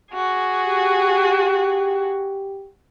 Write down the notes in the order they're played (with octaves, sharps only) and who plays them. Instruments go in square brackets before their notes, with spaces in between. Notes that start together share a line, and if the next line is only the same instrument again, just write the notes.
[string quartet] F#4 G#4
[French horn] G4